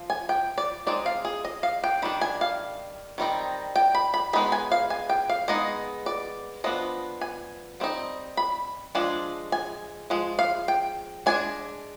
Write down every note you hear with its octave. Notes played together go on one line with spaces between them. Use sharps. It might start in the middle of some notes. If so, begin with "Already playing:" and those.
Already playing: F3
G#5
G5
D5
G#3 C4 D#4 D5
F5
G#4
D#5
F5
G5
D#3 G3 D4 B5
G#5
F5
D#3 G3 C4 D#4
G5
B5
B5
G#3 B3 D#4 B5
G#5
F5
G#5
G5
F5
G#3 B3 D#4 D#5
D5
F3 B3 D4 D#5
G#5
G3 C4 D#4
B5
F3 G#3 D4
G#5
F3 G#3
F5
G5
G#3 D4 G#5